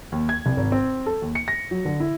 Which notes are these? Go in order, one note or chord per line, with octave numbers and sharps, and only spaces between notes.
D#2
G#6
C2
G#1
C4
A4
D#2
C#7
A#6
F#3
D3
E4